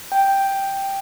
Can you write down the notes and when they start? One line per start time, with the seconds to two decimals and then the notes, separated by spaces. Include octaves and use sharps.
0.12 G5